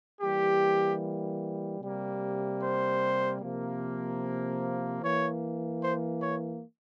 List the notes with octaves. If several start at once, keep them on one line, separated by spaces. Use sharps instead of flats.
E3 G3 A#3 G4
C3 G3 A#3
C5
C3 F3 A#3
E3 A#3 C#5
C5
C#5